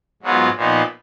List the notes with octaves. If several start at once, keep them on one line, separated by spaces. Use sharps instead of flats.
G#2 F#3 B3 F4
A#2 F3 B3 D#4